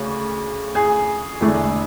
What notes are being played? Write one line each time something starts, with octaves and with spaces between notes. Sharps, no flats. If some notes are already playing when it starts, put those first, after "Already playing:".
Already playing: D2 C#3
G#4
E1 E2 D3 A3 D4